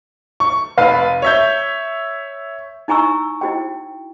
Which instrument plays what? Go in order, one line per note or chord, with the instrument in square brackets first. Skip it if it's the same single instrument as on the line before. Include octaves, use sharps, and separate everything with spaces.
[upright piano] C#6
F1 B4 F5
C#5 E5 G6
[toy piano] D#4 E4 G#5 A#5 C#6 E6
E4 F#4 G5